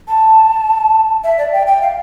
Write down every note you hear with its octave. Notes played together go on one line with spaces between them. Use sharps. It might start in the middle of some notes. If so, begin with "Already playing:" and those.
A5
E5
D5
G5
G5
F5